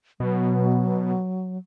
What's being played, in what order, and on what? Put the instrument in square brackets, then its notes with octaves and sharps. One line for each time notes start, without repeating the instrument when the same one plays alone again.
[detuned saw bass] B2 [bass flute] F#3